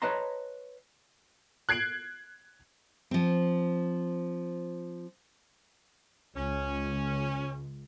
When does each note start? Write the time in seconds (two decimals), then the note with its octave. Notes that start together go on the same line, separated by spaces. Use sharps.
0.02 B4 C#5 D#5 A5 A#5 C6
1.69 F#6 G#6 C7 D7 F#7
3.11 F3 C4
6.37 C#2 C#4